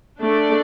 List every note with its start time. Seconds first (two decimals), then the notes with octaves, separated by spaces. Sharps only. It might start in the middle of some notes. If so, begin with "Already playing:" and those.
0.20 A3 D4 A4 D5